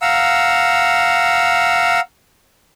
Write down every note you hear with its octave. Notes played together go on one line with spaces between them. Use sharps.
F5 F#5 A#5 E6